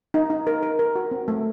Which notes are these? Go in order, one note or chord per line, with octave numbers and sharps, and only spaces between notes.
D#4
D#4
A#4
A#4
A#4
F#4
C4
A3